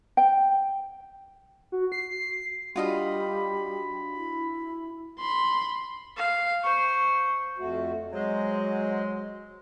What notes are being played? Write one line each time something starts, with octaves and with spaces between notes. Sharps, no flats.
G5
F#4
C7
G3 D4 F4 F#4 D#5 F5 B5
E4
B5 C6
F5
C5 C#6
F2 A3 F#4
F#3 G#3 G#4 C5 D#5